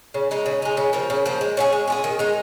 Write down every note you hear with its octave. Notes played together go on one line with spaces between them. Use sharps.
C#3
G#3 D#4
C#3
G#3 D#4
C#3
F3 A#3
C#3
F3 A#3
G#3
C#4 F4 G#4
G#3
C#4 F4 G#4
D#3
G#3 D#4